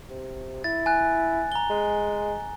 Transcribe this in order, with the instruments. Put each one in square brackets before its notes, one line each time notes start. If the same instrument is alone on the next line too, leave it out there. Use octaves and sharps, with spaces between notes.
[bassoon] C3
[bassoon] E4 [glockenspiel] A6
[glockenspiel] G#5 F#6
A#5 G7
[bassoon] G#3